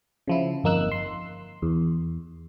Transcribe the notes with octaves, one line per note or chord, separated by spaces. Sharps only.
C#3 F3 E4
G1 F2 A#3 D#4 E6 F#6
C6
E2